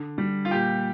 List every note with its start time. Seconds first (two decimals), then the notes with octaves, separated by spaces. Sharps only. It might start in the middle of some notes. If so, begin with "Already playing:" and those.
Already playing: D3
0.18 G3
0.45 F4
0.51 A#2 G4